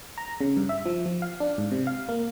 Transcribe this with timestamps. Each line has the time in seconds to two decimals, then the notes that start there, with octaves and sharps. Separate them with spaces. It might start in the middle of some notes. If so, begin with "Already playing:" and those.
0.18 A#5
0.41 C#3
0.57 G2
0.69 E5
0.86 F3
1.06 F3
1.22 F5
1.40 D4
1.58 G#2
1.71 C3
1.87 F5
2.09 A#3